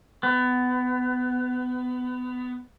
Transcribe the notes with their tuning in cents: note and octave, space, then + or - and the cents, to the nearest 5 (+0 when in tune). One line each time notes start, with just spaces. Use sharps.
B3 +20